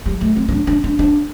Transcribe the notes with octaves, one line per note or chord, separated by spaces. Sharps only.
G3
A3
C4
C4
D4
D4
D4
D4